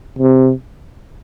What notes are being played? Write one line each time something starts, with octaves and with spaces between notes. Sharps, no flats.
C3